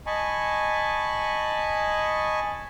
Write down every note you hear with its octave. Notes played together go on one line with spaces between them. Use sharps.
D#5 G#5 A5 B5 C#6